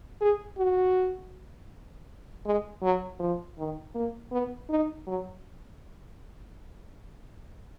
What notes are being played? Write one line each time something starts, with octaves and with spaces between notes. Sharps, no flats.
G#4
F#4
G#3
F#3
F3
D#3
A#3
B3
D#4
F#3